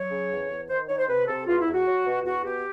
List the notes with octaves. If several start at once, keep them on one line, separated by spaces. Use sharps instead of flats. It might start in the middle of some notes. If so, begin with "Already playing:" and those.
Already playing: F#3 C#5
C#3
E2
E2
D#3 C5
D#3 C#5
C5
C3 B4
C3 A4
E2 F4
E4
E2
F#4
F#3
B2
E2 F#4
B2 G4